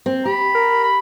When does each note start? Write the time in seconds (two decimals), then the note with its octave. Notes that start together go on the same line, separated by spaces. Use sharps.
0.06 C4
0.25 G4 B5
0.54 A#4
0.84 B5